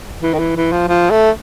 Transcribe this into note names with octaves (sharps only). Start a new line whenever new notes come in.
E3
D#3
E3
E3
F3
F3
A3